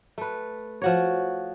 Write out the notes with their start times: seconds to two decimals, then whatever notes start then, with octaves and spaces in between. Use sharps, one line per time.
0.18 A3 B4
0.82 F3 F#4 C#5